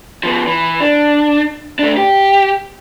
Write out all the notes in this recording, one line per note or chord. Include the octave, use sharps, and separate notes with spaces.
F3 B3
E3
D4
A3 D4
G4